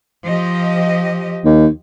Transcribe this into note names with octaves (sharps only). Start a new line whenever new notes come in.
F3 G4 D#5
D#2